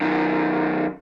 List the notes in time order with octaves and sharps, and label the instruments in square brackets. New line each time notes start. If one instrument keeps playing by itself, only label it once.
[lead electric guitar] F#2 D#3